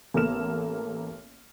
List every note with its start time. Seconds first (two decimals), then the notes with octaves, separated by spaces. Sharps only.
0.14 A1 A#3 B3 A4 F6 E7